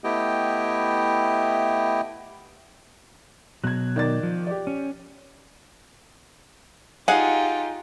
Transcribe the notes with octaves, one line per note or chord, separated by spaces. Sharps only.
A3 B3 E4 G4 D#5 G5
B2 F#3 F#6 G#6
D#3 D5 A6
F3
G4 D5
C#4
D#4 F4 G4 G#4 F5 F#5